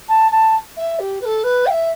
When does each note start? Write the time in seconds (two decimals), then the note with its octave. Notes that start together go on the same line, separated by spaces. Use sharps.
0.09 A5
0.31 A5
0.77 E5
0.99 G4
1.21 B4
1.25 A4
1.44 B4
1.66 G5
1.70 E5